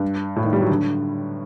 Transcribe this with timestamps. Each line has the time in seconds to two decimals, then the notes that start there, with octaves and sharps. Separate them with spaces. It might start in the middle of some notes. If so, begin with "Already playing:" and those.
Already playing: G2
0.36 A2
0.44 D#3
0.53 G3
0.60 F#3
0.70 D3